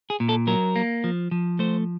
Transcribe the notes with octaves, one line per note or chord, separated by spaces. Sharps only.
G#4
A#2
A4
F#3 A#4
A#3
F3
F3
A3 C5